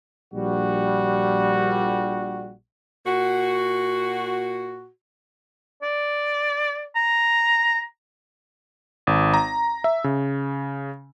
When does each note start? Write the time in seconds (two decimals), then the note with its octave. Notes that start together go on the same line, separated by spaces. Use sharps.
0.34 A#1 G3 F#4
3.05 A#2 F#4
5.82 D5
6.96 A#5
9.07 G#1
9.34 A#5
9.84 E5
10.04 C#3